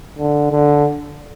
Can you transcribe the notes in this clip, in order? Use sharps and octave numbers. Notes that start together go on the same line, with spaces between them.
D3
D3